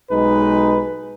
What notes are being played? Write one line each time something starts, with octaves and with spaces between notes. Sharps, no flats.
B1 G#3 D#4 B4